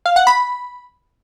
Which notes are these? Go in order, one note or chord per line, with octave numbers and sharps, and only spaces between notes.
F5
F#5
B5